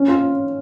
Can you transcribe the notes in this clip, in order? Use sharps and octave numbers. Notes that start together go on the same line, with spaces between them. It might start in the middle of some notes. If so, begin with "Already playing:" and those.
Already playing: C#4
F4